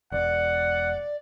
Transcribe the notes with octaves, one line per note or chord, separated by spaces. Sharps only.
E1 D5 F#5